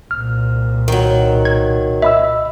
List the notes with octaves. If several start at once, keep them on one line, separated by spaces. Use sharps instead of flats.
C2 A#2 F6
D#3 F#3
G#6
D#5 E5 B5 E6